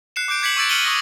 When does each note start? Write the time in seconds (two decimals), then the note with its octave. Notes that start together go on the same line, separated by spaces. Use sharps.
0.16 F#6 C7 C#7 E7
0.28 D6 F#6 G6 D7
0.42 D6 G#6 B6 C#7 F#7
0.57 C#6 D6 E6 G#6 A6 D7
0.69 F6 C#7 D#7 F#7 G7
0.85 C#6 D#6 A#6